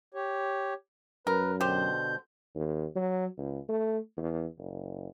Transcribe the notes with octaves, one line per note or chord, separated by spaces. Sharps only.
G4 C#5
F#2 A#4 B4
B2 D3 G4 C5 G6
D#2
F#3
C#2
A3
E2
F#1